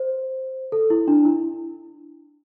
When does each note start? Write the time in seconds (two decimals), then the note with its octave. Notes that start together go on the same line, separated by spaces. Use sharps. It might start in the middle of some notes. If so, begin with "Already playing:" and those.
Already playing: C5
0.72 A4
0.90 E4
1.08 D4
1.25 E4